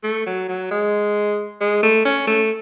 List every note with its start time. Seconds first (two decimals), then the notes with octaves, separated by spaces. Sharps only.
0.04 A3
0.26 F#3
0.48 F#3
0.71 G#3
1.61 G#3
1.83 A3
2.05 C#4
2.27 A3